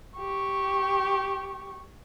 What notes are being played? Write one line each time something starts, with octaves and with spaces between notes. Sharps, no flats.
G4 C#6